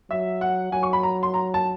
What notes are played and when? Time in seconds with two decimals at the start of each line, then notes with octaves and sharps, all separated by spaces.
0.11 F#3 E5
0.41 F#5
0.72 F#3 G#5
0.83 C#6
0.93 B5
1.03 A#5
1.23 C6
1.34 A#5
1.54 A5